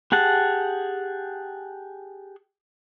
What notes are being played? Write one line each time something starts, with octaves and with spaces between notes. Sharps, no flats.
G4 G#4 F#5 A5